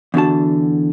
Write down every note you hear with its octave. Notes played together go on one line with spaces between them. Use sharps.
E2 D3 F#4 A5